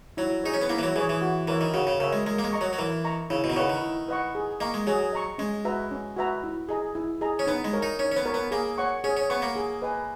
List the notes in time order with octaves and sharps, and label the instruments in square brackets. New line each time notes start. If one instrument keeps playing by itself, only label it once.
[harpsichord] F#3 [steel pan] E4
[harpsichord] D#4 [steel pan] G#4 C#5
[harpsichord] C#4
B3
[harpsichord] A#3 [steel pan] E4
[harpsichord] E3
F#3
[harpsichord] E3 [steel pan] G#4 C#5
[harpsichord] E3
[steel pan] F#4
[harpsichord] E3 [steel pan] A#4 C#5 E5
[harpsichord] D#3
[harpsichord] C#3 [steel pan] F#4
[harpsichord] C#3
[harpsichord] C#3 [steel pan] A#4 C#5 E5
[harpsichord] G#3
[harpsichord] G#3 [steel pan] A#4
[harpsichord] A#3
G#3
[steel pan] D#5 A#5 C#6
[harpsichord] F#3
F#3
[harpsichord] E3 [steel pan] A#4
[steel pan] D#5 A#5 C#6
[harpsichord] C#3 [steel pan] E4
[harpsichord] B2
D#3
[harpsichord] C#3 [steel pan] B4 D#5 F#5 C#6
[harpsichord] D#3
[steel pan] E4
B4 D#5 F#5 C#6
G#4
[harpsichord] A#3 [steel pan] D#5 A#5 C#6
[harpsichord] G#3
[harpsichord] F#3 [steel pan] G#4
[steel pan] D#5 A#5 C#6
[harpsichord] G#3 [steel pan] C#4
[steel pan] F#4 B4 E5 A#5
C#4
F#4 B4 E5 A#5
E4
G#4 D#5 A#5
E4
G#4 D#5 A#5
[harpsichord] C#4
[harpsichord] B3 [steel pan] D#4
[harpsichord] G#3
[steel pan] A#4 C#5
[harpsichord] D#4
[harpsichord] C#4 [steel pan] D#4
[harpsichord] C#4
B3
[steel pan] A#4 C#5
[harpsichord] B3
[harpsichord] A#3 [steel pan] G#4
[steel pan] C#5 F#5 C#6
[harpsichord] C#4 [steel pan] G#4
[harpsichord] C#4
[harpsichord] B3 [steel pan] C#5 F#5 C#6
[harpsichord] A#3
[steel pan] G#4
B4 D#5 G#5